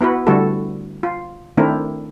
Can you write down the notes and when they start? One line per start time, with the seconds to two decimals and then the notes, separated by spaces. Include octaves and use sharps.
0.01 B3 E4 F#4 B4
0.27 D3 G3 A3 E4 F#4 A4
1.03 F4
1.57 D#3 A3 C4 D4 E4 A#4